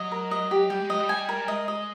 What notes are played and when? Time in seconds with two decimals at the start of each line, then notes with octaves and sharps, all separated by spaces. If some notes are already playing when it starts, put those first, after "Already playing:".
Already playing: F#3 D#5
0.12 A#4
0.31 D#5
0.51 G4
0.70 G3 G4
0.80 G#3
0.90 F#3 D#5
1.00 G3
1.09 G#5
1.29 A#4
1.48 G#3 D#5
1.68 D#5